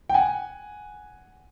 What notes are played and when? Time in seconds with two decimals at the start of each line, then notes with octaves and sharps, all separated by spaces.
0.09 G5
0.14 F#5 G#5